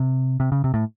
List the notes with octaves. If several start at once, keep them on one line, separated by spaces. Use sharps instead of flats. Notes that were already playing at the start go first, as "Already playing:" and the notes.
Already playing: C3
C3
C#3
C3
A2